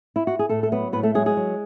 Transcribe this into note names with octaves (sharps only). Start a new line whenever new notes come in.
E4
F#4
G#4
A2 A3 A4
A4
F#3 B3 B4
A2 B3 B4
A3 A4
F#3 G#3 G#4
G#3 G#4
F#3